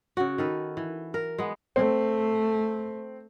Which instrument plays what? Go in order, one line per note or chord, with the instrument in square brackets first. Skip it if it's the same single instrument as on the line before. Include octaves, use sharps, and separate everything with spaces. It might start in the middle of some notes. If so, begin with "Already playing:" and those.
[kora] C#3 F#4
D#3 A4 B4
E3
A#4
G#3 B3
[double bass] A3 [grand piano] C4